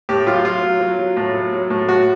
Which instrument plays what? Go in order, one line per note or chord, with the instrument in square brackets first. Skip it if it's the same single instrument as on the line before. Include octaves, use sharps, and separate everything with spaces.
[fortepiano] A2 G4
F#3 F4
F#3 F4
F#3
F#3
F#3
A2
F#3
F#3
A2
A2 F#4